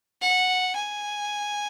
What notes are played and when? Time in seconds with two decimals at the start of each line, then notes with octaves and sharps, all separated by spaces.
0.21 F#5
0.75 G#5